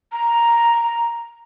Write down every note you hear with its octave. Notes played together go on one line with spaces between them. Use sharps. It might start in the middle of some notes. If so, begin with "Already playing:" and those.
A#5